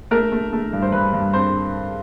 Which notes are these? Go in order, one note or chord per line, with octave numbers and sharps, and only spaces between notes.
A3 A#4
A3
A3
G2
C5
G2 B4
G2
C4 C5